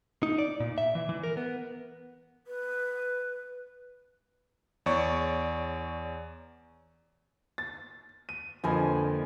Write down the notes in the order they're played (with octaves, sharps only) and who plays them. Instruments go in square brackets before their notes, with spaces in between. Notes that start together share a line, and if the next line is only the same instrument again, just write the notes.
[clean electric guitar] D#4
D5
A#2
E5
E3
E3
A#4
B3
[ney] B4
[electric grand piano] E2 C#5 D5 C#6
[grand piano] A6
D#7
[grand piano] F2 A#2 F3 [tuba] D3 [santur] B4 D#5 G#5